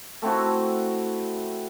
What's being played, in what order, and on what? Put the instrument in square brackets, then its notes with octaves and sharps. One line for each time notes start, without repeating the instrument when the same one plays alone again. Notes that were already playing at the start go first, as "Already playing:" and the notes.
[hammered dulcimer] A3 C4 E4 F#4